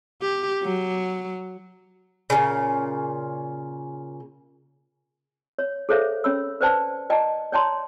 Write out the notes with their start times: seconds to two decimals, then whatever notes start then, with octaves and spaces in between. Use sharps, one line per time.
0.22 G4
0.63 F#3
2.30 A#2 C#3
5.59 C#5
5.89 G#4 A4 C5 C#5 E5 F5
6.24 C#4 C#5 B5 E6
6.61 B4 C5 D5 G5 A5
7.10 D5 D#5 G5 A5 A#5
7.52 C#5 D5 G5 A5 A#5 C6